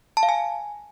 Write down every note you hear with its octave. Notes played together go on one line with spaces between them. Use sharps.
A5
F5
G#5